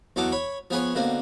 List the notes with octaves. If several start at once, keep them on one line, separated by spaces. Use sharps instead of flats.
E2 F#3 D#4 A4 D6
C#5 B5
F3 B3 G#4 B4 C#5
B2 D3 A#3 C4